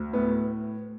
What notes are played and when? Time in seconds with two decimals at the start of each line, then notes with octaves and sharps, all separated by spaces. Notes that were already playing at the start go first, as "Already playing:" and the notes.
Already playing: D2
0.13 A2 B3